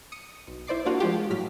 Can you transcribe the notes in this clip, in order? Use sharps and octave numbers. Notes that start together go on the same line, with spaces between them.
D#6 C#7 D#7
B1
E4 C5 D5 D6 C7
A#3 D4 F4 F#4
F3 G#3 F4 G4
A2 F#3 F6 B6